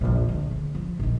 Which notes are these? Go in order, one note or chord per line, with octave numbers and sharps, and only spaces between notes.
A#1 F2
D2 A3
D2
F3
A#1 D#3